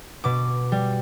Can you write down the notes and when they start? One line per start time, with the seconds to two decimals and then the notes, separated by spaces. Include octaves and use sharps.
0.24 B2 D6
0.72 G3